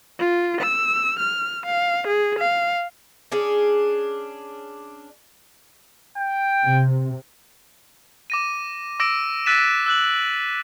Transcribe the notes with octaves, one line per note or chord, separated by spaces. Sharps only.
F4
E6
F6
F5
G#4
F5
C#4 D4 G#4
G5
C3
D6 A#6 D#7
D6 E6 A#6 D7
E6 F#6 A6 B6 D#7 E7
E6 F#6 F#7